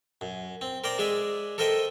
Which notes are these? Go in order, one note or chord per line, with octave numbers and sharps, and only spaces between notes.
F#2
C4
A#4 C5 D5 G5 A#5
G#3 G#4 D5 E5
A4 A#4 C5 D#5 E5 G5